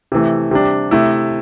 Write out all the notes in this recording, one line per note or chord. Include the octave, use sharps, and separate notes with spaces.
C3 E3 A3
C3 G3 D4
C3 A3 E4